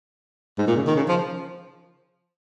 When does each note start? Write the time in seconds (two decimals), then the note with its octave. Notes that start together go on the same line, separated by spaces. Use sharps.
0.58 G#2
0.67 A#2
0.77 C#3
0.87 D#3
0.96 C#3
1.09 F3